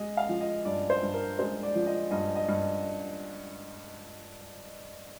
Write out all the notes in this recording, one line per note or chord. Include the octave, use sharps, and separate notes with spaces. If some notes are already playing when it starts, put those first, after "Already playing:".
Already playing: G#3 D#5
F5
F3
D#5
G2 D5
C5
G2
A#4
G#3 C5
D5
F3
D#5
G2 D#5
D#5
G2